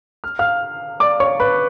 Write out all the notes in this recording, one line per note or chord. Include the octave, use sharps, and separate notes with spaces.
F6
F5 F6
D5 D6
C#5 C#6
B4 B5